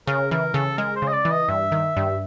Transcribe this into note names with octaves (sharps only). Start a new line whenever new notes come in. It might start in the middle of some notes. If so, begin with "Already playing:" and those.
C#3 A#4
E3 A#4
C#3 A4
G#3 A#4
C5
C#3
D#5
D5
E3
D#5
G2 E5
D#3
G2